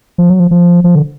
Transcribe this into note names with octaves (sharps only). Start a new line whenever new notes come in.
F3
F#3
F3
F3
F3
D3